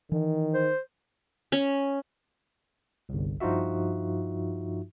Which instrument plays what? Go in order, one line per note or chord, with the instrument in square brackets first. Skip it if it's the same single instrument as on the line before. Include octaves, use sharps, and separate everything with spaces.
[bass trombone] D#3 [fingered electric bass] E3
[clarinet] C5
[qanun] C#4
[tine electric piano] G1 C2
G2 F3 D#4 F4 F#4 E5